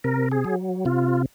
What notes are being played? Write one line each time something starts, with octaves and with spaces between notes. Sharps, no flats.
C3 A#4
G#4
F#3
C3 F4